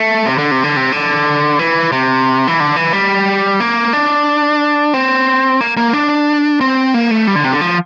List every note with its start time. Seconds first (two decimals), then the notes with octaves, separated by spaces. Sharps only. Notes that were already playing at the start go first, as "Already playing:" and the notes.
Already playing: A3
0.26 C3
0.38 D3
0.51 C3
0.64 D3
0.77 C3
0.92 D3
1.59 E3
1.92 C3
2.47 E3
2.60 D3
2.76 E3
2.93 G3
3.60 A#3
3.93 D4
4.94 C4
5.61 A#3
5.77 A#3
5.93 D4
6.61 C4
6.94 A#3
7.11 A3
7.27 G3
7.35 D3
7.44 C3
7.52 D3
7.61 F3